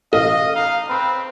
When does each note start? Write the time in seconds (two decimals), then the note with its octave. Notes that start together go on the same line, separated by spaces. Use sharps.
0.13 A1 D#5 F5
0.55 D#4 F5
0.89 C4 B4